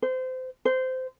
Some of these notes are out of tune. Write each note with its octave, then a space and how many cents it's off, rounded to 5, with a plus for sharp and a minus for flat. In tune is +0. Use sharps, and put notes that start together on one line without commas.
C5 -25
C5 -20